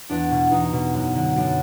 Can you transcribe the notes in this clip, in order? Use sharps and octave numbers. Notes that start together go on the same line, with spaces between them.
E2 D4
B2
E2 D#4
B2
F#2
D3
F#2 D4